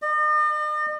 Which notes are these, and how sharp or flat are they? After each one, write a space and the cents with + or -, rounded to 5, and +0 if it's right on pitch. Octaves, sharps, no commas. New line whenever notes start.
D#5 -45